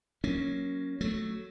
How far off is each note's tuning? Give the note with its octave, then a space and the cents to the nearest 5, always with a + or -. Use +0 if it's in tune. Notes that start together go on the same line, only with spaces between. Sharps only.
F#3 +0 A#3 +5 C#4 +0
F#3 +0 A3 +0